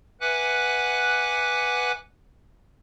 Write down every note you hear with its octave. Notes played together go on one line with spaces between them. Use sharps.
B4 E5 F#5 G#5 D6 F#6